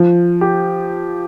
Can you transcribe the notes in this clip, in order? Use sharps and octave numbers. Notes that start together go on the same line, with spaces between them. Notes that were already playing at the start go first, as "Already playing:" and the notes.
Already playing: F3
G4